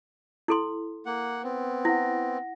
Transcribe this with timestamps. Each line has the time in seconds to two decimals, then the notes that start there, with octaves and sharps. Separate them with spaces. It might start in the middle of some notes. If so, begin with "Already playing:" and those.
0.48 E4 A4 C6
1.06 A#3 F#5
1.43 B3 C4
1.85 E4 F#5 A#6